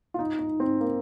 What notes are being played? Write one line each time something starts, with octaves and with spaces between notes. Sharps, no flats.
F4
G#2 D#4
G#2 D#4
G#2
C4
G#2
A#3